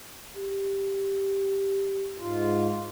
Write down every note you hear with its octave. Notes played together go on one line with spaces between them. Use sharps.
G4
G#2 F4